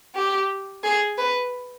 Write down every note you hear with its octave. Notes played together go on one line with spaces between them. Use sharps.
G4
G#4
B4